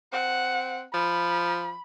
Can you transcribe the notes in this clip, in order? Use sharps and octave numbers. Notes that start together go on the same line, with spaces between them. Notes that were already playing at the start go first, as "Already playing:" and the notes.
C4 F#5
F3 B5